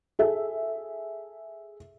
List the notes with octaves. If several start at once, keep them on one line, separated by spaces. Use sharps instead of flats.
G#4 A4 E5